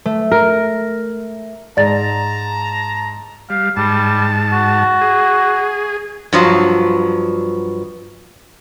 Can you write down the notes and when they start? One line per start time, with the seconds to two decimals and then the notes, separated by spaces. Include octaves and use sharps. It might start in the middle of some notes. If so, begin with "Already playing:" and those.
0.06 A3
0.32 A#4
1.77 G#2 D5 A5 A#5 A6
3.50 G3 F5
3.77 G#2 G3 A5
4.52 F#4
5.01 G#4
6.33 G2 F3 F#3